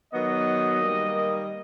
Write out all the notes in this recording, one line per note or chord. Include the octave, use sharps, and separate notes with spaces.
D#3 F#3 B3 D#5
D#3 G3 A#3